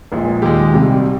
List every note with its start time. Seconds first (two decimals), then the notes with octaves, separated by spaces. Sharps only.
0.12 A#1 A#2 G#3
0.42 D#2 D#3 G#3 G4
0.73 C2 C3 G3